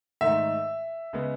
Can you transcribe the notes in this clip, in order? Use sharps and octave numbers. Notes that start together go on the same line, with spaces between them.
G#2 D#3 A3 D#4 E5
C#3 G#3 B3